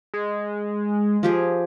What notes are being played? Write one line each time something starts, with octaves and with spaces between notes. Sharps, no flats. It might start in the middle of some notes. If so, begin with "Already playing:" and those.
G#3
F3 G4 G#4